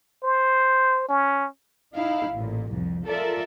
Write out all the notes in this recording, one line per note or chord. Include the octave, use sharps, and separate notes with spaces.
C5
C#4
D#4 E4 F5
A1 A#2
C2 F2
F4 A4 A#4 D5 E5